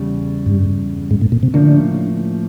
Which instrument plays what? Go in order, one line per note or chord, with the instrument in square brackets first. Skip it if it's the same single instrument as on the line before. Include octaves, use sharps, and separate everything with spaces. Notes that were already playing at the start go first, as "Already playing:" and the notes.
Already playing: [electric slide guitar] E2 C#3 G3
[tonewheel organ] G2
G#2
A2
A#2
C3
[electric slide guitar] A2 F3 A#3 C#4 [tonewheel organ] D3